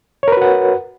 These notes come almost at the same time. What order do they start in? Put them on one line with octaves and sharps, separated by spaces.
C#5 A#4 B4 F#4 F#5